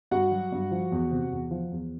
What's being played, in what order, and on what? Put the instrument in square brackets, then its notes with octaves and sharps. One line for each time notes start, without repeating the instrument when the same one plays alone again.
[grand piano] G2 F#4 F#5
F#3
G2
F3
E2
C3
E2
F3
E2